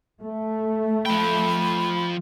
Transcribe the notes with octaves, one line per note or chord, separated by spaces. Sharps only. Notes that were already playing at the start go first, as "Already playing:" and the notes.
A3
F3 G5 B5